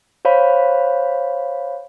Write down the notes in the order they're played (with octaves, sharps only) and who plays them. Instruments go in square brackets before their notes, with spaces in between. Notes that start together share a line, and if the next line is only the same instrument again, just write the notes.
[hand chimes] C5 C#5 F5 B5